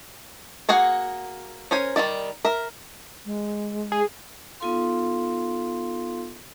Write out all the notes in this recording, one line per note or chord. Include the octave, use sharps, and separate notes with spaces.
A#3 F#4 G#4 F#5
C#4 A#4 C5 G#5
D#3 G3 E4 D5
A#4 E5
G#3
G#4
B3 D#4 F4 A4 F5 C6